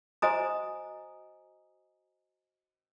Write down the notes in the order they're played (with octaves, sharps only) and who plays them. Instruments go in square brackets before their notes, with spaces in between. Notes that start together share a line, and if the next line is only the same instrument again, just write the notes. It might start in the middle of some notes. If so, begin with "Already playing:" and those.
[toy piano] F#4 C5 D#5 G#5 A#5 D#6